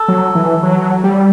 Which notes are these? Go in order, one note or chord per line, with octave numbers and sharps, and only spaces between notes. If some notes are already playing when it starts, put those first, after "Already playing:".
Already playing: A4
F#3
E3
F#3
G3